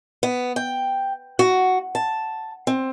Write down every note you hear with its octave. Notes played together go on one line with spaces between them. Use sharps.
B3
G5
F#4
A5
C4